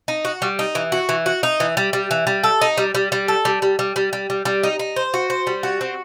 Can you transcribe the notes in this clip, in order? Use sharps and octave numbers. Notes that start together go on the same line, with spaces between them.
D#4
F#4
G3
D#4
E3
F#4
E3
F#4
D#4
E3
G3
G3
E3
G3
A4
D#4
G3
G3
G3
A4
G3
G3
G3
G3
G3
G3
G3
D#4
D#4
C5
F#4
C5
G3
F#4
C4